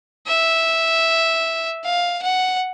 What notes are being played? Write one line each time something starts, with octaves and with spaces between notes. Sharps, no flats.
E5
F5
F#5